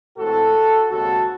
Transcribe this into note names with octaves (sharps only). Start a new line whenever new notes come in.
A2 E3 G#3 C4 F#4 A4
D#2 C#3 G#3 C4 F#4 A4